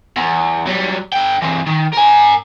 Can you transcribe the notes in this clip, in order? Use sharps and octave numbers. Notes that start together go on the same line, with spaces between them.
E2
F#3 G3
D3 G5
E3 C4
D#3
A#4 G#5